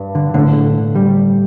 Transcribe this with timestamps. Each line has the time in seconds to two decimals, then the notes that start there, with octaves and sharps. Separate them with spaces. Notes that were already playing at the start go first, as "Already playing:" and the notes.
Already playing: G2
0.15 D3
0.34 A2 D3 A3 D4
0.95 G3